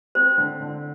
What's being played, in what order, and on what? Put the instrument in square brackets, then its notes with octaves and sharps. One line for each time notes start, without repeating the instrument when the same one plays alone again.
[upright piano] C4 [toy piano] C5
[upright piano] D3
D3